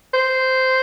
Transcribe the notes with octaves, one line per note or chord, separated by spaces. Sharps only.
C5